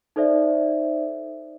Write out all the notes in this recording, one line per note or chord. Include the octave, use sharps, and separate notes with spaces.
D#4 A4 C5 D5 E5